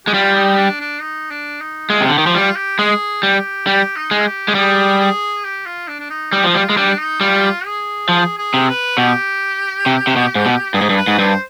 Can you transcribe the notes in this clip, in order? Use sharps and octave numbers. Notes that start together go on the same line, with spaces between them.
G#3 G4
G3 F4
D#4
D4
D4
D#4
D4
D#4
G#3 F4
C3
D3 G4
D#3
F3
G3 F4
G4
G#3 G#4
G3 G4
G3 G4
D#4
G#3
F4
G4
G#3
G3 G#4
G#4
G4
F4
D4
D4
D#4
G3 D#4
F3
G3 F4
G#3
G3 D4
D#4
G3 F4
G#4
F3 G#4
G#4
C3
B4
B2 G4
C3
C3
B2
G#2
B2
G2 G#4
G#2
G2
B4
G#2
G2 C5